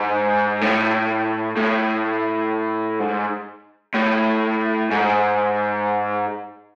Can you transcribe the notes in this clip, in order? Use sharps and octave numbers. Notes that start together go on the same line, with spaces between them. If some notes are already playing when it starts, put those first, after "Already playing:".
Already playing: G#2
A2
A2
G#2
A2
G#2